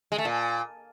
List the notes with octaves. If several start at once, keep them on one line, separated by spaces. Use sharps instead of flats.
G#3
A3
A#2